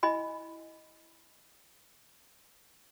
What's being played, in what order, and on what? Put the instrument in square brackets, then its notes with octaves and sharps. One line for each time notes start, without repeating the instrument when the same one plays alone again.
[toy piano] E4 D#5 G#5 B5